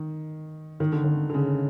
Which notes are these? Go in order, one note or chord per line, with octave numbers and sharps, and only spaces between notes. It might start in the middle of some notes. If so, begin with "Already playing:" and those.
Already playing: D#3
D#3
D3
D#3
D3
C#3